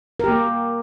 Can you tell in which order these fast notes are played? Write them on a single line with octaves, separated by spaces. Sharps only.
A#4 G4 A#3